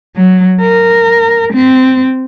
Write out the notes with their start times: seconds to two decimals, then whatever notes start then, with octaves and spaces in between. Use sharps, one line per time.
0.16 F#3
0.61 A#4
1.53 C4